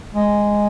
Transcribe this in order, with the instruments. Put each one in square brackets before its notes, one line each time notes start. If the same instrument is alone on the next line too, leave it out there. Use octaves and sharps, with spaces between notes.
[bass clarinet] G#3